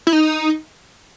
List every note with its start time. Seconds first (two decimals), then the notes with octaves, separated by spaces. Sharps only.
0.07 E4
0.13 D#4